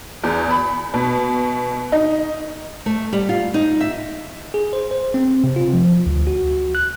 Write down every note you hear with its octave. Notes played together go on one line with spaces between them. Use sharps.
E2
B5
B2
D#4
A3
G3
F4
D#4
E5
G#4
C5
C5
C4
C3
F4
F3
D2
F#4
F#6